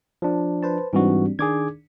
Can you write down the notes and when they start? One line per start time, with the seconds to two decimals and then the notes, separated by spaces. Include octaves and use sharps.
0.22 F3 D4
0.63 B4 C5 A5
0.93 G#2 E3 G3 C4 D4 F#4
1.39 D#3 D4 G#4 D6 G#6